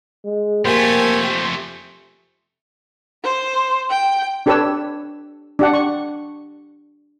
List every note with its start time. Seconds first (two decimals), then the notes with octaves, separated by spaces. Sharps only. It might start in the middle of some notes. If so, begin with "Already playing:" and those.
0.25 G#3
0.65 F2 A3 A#3 G4 C5 G#5
3.24 C5
3.90 G5
4.46 D4 G4 A4 B4 C#5 E6
5.59 D4 G4 F#5
5.74 C#6